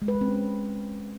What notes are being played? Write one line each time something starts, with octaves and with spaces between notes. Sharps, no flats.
G#3
B4
G#3
C4
C#4